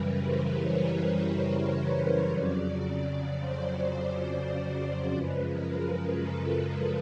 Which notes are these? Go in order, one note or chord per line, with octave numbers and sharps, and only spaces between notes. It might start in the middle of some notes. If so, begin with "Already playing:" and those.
Already playing: F#2 C#3 E3 G3 A#4 B4
C5
C#5
F2 C#3 F#3 D5
C5
F#2 C#3 F3 G#3 B4
A#4
A#4
A4